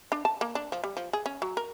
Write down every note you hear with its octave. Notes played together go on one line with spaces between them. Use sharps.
D4
A5
A#3
D4
F3
G3
F3
G#4
C#4
F#3
A#4